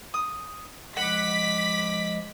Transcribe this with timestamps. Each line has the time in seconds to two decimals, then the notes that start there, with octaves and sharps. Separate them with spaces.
0.14 D#6
0.97 F3 G#3 D#5 F#5 B5 D6 B6